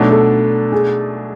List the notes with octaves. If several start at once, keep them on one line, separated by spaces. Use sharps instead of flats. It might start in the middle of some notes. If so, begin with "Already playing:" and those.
Already playing: B2 F#3 A3 D4 A4
A4
G#4